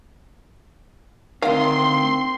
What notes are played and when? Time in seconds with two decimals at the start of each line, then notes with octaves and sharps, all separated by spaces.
1.42 D2 D#3 C4 F5 C6